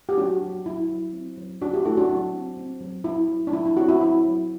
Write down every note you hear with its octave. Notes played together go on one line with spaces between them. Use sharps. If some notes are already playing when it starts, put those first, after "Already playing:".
G4
F#3 D4 F#4
F#3
F#3 E4
F#3
C4
F#3
F#3 D4 F#4
E4 G4
A3 F#4 A4
D4 F#4
F#3 D4
C4
C4
F#3
F#3 E4
F#3
D4
F#3 E4
E4
C4 D4 F#4
E4
F#3 E4
F#3